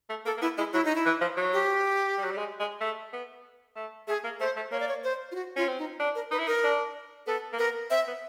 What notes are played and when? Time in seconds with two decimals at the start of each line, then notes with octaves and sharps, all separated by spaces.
0.09 A3
0.25 A#3 A4
0.37 A#3
0.42 B3 E4
0.58 G#3 E4
0.73 F#3 E4
0.85 D#4
0.95 E4
1.06 E3
1.21 F3
1.37 F#3
1.53 G4
2.18 G3
2.24 F#3
2.31 G3
2.38 G#3
2.60 G#3
2.81 A3
3.13 B3
3.76 A3
4.08 A3 G#4
4.24 A#3
4.40 A3 C5
4.56 A3
4.72 A#3 C#5
4.80 D5
4.88 C#5
5.04 C5
5.32 F4
5.35 F#4
5.56 C#4 F4
5.68 C4
5.78 D#4
6.00 D4
6.15 A#4
6.31 D#4 B4
6.39 E4
6.47 D#4 A#4
6.64 D4
7.27 B3 A4
7.53 A#3
7.59 B3 A#4
7.91 C4 E5
8.07 B3